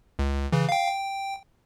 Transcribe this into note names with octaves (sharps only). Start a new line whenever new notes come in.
C#2
C#3 E3
F5 G5
G5